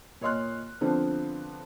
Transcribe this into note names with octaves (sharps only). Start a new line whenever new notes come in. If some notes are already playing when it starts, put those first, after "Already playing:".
A#2 C#5 D#5 C6 F6 F#6
D3 F3 B3 C4 D4